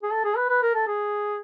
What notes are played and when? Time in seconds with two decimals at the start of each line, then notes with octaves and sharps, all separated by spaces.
0.03 G#4
0.12 A4
0.25 G#4
0.37 B4
0.49 B4
0.62 A#4
0.75 A4
0.87 G#4